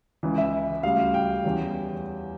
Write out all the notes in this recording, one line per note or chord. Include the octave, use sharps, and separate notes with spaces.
C#2 C#3 E3
E5
D2 C#3 G3 F5
G5
E2 E3 G3 C#4